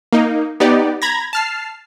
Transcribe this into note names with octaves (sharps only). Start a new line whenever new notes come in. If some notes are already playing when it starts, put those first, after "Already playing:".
A#3 D#4
B3 D#4 G4 D5
A#5 B5 G#6 A#6
A5 F6 C7